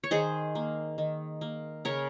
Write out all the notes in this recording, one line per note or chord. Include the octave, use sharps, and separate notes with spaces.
C#5
D#3 G#4 C5
A#3
D#3
A#3
C#3 A#4 C#5